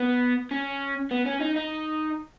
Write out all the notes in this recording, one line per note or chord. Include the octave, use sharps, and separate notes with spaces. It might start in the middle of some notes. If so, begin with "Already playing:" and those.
Already playing: B3
C#4
B3
C#4
D#4
D#4